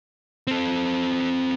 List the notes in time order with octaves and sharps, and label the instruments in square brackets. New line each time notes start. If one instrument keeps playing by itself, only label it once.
[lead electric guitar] C4 A4